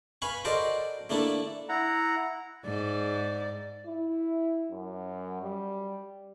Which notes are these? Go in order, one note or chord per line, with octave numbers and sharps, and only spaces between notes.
B4 F5 G#5 B5 C#6
F#4 A4 A#4 C5 D5 D#5
A3 A#3 D4 E4 A4
E4 F#5 A#5
G#2 D5
E4
F#2
G3